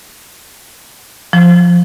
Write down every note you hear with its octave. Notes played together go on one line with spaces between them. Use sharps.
F3